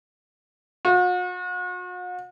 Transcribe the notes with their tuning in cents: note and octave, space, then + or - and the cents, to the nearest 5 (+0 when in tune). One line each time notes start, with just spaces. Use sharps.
F#4 -45